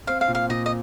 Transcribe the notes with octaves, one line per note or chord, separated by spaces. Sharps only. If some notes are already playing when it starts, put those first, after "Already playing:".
C4 F5
F5
A#2
F5
A#2 D#5
D#5